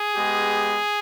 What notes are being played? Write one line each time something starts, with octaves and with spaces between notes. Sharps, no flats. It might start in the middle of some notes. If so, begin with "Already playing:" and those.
Already playing: G#4
G#3 B3 G4